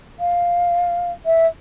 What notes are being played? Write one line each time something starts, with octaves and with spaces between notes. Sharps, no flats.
F5
E5